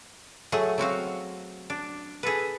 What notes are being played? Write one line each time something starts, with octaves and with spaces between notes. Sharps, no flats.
F#3 A3 G#4 F#5
F#3 C4 F#4 F5
D4
G#4 A4 B4